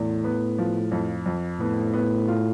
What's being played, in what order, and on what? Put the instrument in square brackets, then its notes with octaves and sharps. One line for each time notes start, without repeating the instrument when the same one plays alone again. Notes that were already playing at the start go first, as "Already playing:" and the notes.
Already playing: [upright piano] E2 [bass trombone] A2
[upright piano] B3
F3
F2
F2
[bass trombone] A2 [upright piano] B3
[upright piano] B3
F4